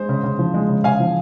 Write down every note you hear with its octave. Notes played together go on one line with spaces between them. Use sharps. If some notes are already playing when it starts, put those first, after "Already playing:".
Already playing: G#3 C5
C#3
C#3
F3
G#3
C#3
C#3 F5 G#5
F3